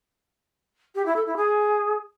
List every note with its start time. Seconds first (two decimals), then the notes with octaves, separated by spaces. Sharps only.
0.95 G4
1.05 E4
1.15 A4
1.26 E4
1.36 G#4